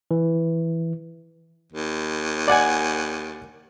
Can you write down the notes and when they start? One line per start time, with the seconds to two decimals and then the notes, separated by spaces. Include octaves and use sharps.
0.11 E3
1.72 D#2
2.48 D5 F#5 G#5